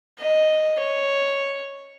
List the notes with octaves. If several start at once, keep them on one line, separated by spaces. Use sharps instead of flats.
D#5
C#5